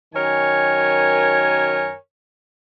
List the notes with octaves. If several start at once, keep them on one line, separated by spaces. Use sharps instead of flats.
F#2 D#3 A#4 C#5 G#5